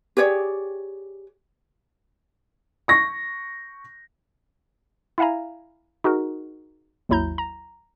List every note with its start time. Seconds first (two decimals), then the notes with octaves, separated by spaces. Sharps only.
0.17 G4 G#4 C#5 D5
2.88 C#6 A#6
5.18 E4 E5 F5 G#5 A#5
6.04 D#4 F#4 G#4 A#4
7.09 G#1 D#2 F#3 E4 A#5 G6
7.38 A#5